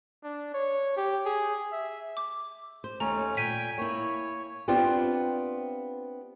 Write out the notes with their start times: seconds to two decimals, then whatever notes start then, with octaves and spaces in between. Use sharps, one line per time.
0.24 D4
0.54 C#5
0.97 G4
1.26 G#4
1.72 E5
2.17 D6
2.84 C5
3.00 D#2 A3 C#4 A#5
3.37 A#2 G5 G#5 B6 D#7
3.78 A#3 E4 C#5
4.68 B3 C4 D4 F4 G4 C5